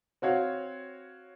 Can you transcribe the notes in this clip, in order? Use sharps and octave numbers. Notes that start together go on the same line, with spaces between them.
C4 F#4 C#5 F5